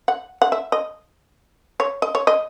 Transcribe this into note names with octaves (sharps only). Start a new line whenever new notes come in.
F#5
F#5
E5
D#5
C#5
D#5
C#5
D#5